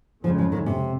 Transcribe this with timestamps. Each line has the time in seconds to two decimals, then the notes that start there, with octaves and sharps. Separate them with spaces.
0.24 F2 C#3 F3 G#3
0.38 F3
0.52 D#3
0.66 C3